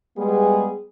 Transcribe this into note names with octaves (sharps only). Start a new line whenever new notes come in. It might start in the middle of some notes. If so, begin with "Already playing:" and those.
G3 G#3 B3 G#4